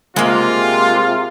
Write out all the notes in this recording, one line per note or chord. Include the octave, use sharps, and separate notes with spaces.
C3 G#3 A#3 F4